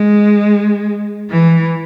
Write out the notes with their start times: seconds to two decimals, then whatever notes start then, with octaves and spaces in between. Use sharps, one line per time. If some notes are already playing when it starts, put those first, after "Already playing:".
Already playing: G#3
1.30 E3